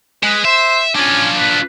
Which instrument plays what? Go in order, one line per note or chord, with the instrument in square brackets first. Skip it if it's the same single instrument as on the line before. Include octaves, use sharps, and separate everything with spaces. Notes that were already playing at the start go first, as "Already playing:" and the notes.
[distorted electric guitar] G#3 [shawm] B4
[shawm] C5 [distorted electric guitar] E5
[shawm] C#4 [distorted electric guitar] D4 F4
[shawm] B4